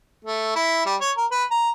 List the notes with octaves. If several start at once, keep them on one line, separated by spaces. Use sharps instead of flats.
A3
E4
G3
C#5
A#4
B4
A#5